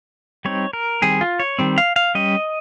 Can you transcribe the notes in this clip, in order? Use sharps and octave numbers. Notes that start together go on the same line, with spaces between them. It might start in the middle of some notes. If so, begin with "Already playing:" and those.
G3 C4 D#4 C#5
A#4
D#3 G3 C4 G#4
F4
C#5
D#3 G3 C4
F5
F5
G3 C#4 D#5